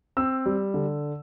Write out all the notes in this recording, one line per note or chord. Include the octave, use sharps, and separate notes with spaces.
C4 E6
G3
D3